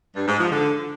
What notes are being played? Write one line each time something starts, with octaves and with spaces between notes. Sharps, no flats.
G2
G#2
F3
D3